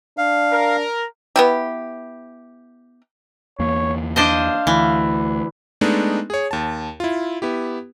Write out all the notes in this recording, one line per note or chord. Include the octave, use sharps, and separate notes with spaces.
D4 F5
A#4
B3 E4 G4
E2 A#3 C#5
D4 C5 D#5 F5
D2 E3
G#3 A3 B3 D4 D#4
G#4 C#5
D#2 A5
E4 F4
B3 E4 G4